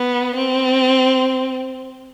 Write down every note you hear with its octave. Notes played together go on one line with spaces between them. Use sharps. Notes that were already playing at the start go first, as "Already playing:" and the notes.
Already playing: B3
C4